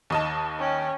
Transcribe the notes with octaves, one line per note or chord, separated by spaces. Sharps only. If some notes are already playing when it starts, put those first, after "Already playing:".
D#2 D#5 A5
C#4 G5